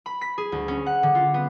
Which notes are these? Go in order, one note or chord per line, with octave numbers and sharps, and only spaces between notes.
B5
B6
G#4
D2
C#4
F#5
D3
F4
B3